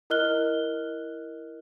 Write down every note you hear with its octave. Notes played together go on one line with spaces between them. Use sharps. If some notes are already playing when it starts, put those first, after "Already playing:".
E4 A#4 D#5 F6 F#6 G7